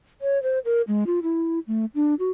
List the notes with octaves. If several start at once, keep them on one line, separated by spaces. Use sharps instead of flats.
C#5
C5
A#4
G#3
F4
E4
A3
D4
F#4